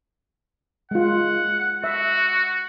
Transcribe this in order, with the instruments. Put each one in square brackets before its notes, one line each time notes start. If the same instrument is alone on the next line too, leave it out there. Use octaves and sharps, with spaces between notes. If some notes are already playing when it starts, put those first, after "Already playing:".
[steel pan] G#3 F4 [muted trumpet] F#5
[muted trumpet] F#4 [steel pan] E5